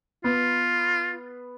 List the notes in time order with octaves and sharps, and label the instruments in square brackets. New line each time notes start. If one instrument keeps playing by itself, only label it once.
[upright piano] B3 [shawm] F4